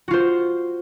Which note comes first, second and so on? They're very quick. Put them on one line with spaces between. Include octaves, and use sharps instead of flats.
F#4 F4 C5